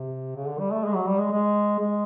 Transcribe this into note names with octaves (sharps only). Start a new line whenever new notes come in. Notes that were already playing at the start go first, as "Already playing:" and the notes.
Already playing: C3
C#3
D3
G3
A3
G#3
F#3
G3
G#3
G#3
G#3